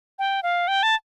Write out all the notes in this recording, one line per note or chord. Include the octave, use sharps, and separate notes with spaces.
G5
F5
G5
A5